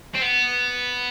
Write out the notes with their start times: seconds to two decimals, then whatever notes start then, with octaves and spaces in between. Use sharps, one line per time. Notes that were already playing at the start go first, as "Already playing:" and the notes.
0.15 C4
0.22 B3